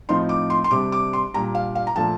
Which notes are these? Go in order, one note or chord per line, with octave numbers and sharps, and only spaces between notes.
A2 F3 C4 D#4 C6
D6
C6
C6
C3 G3 D4 D6
D6
C6
A#2 G3 D4 A#5
F5
F5
A#5
A#2 F3 A3 D4 A5